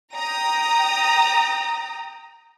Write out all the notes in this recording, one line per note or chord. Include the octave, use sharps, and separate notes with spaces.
G5 A#5 D#6